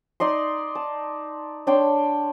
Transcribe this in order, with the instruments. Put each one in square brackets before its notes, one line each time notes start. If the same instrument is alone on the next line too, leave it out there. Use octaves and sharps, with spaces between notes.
[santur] D#4 D5 D#5 C6
A5
D4 C#5 G5 C6